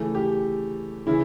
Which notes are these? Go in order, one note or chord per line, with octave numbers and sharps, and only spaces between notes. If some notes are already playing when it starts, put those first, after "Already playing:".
Already playing: C#3 E3 A3
G4
C#3 E3 E4